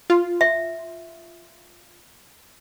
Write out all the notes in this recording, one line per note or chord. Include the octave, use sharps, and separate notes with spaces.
F4
E5